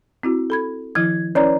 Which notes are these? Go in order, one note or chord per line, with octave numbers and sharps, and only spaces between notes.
C4 E4 F#4
A4 B5 G#6
D#3 F3 E4 G#6
C#4 E4 B4 C#5 D5 A#5